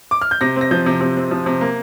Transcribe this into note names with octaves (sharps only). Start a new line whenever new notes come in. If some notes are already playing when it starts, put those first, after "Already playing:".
D6
F6
G6
C3 A#6
C4
A#6
F3 G6
C3
C3
C4
F3
C3
A#3